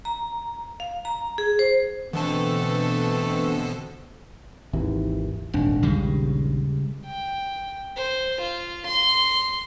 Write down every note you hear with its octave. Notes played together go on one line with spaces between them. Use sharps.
A#5
F5
A#5
G#4
C5
B2 D3 E3 A3 B3 C4 A4
G#1 D#2 E3
D#1 G#1 D4
A#1 D#2 C#3 G3 G#3
G5
C5
F4
C6